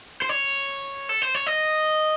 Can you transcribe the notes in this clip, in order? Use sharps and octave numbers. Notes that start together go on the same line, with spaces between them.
C5
C#5
A4
C5
C#5
D#5